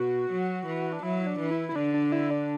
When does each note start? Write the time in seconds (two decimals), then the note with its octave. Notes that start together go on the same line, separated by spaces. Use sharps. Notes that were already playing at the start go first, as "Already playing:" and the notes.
Already playing: B2 F#4
0.31 F#3
0.66 E3
0.93 D4
1.02 F#3 E4
1.27 D4
1.39 E3
1.51 E4
1.69 E4
1.75 D3 D4
1.94 D4
2.12 E4
2.31 D4